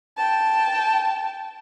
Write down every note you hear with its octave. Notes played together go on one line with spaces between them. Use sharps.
G5 A5